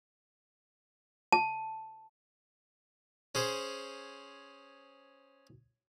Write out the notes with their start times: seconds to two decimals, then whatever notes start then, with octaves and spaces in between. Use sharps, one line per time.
1.32 A5
3.35 C#4 G#4 C5